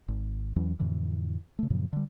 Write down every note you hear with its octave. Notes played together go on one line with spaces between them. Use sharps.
G#1
E2 E3 F#3 C#4
F2 A2 D3 E3
C#3 A3
F#2 A#2 C#3 F3
D3 G3